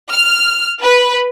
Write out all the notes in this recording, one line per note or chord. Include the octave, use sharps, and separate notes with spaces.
F6
B4